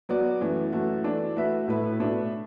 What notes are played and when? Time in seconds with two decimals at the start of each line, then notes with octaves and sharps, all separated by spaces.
0.09 F#3 B3 F#4 D5
0.40 F#2 E3 A3 F#4
0.72 F#2 E3 A3 F#4
1.04 E3 D4 A4 D5
1.36 A3 F#4 B4 E5
1.68 A2 A3 E4 B4
1.99 B2 A3 D4 B4